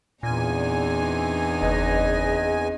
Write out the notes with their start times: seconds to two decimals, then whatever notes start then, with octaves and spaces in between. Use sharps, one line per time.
0.23 E2 A#2 C4 D4 D#4 G#5
1.62 F#1 G#4 B4 D#5